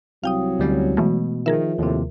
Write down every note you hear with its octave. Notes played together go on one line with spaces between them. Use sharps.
C2 F#3 F5 G5 D#6
D2 G3 C#4
B2 E3 G#3 A3
D#3 F3 G#4 A#4 E5
D#2 A2 C3